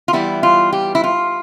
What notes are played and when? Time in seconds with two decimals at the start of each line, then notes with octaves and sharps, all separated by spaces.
0.08 F4
0.13 E3 G3 B3 E4
0.43 F4
0.73 G4
0.95 E4
1.04 F4